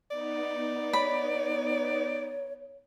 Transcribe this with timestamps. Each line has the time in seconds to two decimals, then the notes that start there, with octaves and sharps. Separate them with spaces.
0.10 B3 D#4 D5
0.93 C#5 B5